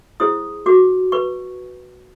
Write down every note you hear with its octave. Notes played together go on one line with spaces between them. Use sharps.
E4 G#4 C5 D#6
F#4 D6
B4 C#6